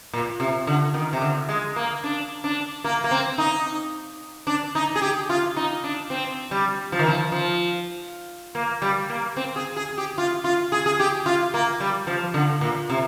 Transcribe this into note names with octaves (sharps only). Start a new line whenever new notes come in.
A#2
C3
D3
D#3
C3
D3
G#3
A#3
D4
D4
A#3
A#3
C4
D#4
D4
D#4
G#4
G4
F4
D#4
D4
C4
G3
F3
D#3
F3
F3
A#3
G3
A#3
C4
G#4
G#4
G4
F4
F4
G#4
G#4
G4
F4
A#3
G3
F3
D3
A#2
C3